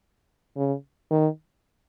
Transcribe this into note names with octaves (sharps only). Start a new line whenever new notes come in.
C#3
D#3